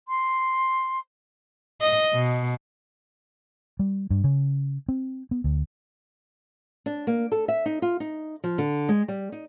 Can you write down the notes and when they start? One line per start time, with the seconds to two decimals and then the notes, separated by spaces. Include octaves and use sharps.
0.08 C6
1.82 D#5
2.13 B2
3.79 G3
4.10 G2
4.24 C#3
4.88 C4
5.31 B3
5.44 D2
6.86 D4
7.07 A#3
7.32 A4
7.48 E5
7.66 D#4
7.82 F4
8.00 D#4
8.44 F3
8.58 D3
8.89 G#3
9.08 G3
9.32 D#4